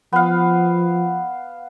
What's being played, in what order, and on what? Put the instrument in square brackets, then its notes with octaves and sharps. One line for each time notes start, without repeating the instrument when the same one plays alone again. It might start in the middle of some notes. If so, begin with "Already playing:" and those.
[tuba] F3 [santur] B3 F5